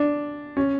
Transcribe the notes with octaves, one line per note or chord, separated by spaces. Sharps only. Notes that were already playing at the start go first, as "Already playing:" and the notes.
Already playing: D4
C#4